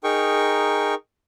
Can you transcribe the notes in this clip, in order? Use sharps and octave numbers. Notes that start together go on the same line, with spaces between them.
D#4 G#4 A#4 G5 C#6